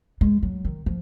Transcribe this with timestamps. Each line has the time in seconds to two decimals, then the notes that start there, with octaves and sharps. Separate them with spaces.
0.21 G#3
0.43 F#3
0.65 D#3
0.86 F3